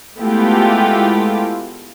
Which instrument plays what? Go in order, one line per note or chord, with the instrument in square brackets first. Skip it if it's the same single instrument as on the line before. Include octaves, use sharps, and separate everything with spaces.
[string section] G#3 A3 B3 E4 F4 G4